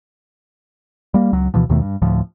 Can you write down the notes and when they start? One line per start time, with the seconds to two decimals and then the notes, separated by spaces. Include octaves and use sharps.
1.14 G3 A#3
1.32 C#2 F#3
1.54 D2 B2 E3 F3
1.69 D#2 B2 D#3 A3
1.81 G2
2.02 D2 A2 F3